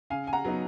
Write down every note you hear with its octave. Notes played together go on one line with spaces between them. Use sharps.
C#3 F5 G#5
G#5
F#5 A#5
F#3 B3 D#4